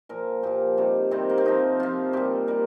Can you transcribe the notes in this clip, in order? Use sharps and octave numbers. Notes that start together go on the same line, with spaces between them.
A#2 F3 A#4
A#2 F3 G4
C3 D#3 G3
C3 D#3 G3 C4
A#3
C4
C3 F3 D#4
C3 F3 F4
A#2 G3 G4
A#2 G3 A#4